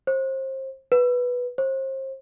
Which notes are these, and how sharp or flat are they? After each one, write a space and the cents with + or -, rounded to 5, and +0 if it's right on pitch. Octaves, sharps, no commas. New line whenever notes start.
C5 +30
B4 -5
C5 +35